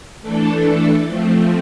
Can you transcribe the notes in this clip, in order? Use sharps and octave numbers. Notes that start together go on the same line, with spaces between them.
E3 A3 D4 A4
F3 A3 C4